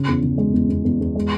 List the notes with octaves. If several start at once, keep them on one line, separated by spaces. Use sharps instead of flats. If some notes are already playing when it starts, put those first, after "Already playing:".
Already playing: C#3
E2
C#3
G#3
E2
E2
E2
E2
G#3